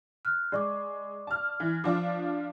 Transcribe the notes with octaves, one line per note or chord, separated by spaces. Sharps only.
F6 F#6
G#3 D5 C#6 D6
A5 F6
E3
F3 D4 F4 D6